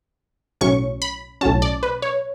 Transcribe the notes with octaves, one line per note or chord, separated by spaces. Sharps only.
B1 A2 F#3 C#4 C#6
B5
B1 A2 F#3 C#4 A5
D5
B4
C#5